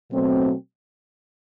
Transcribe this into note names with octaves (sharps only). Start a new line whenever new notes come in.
B2 F#3 A3 C4